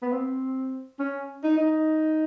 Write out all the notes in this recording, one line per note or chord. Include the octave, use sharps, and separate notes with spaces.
B3
C4
C#4
D#4
D#4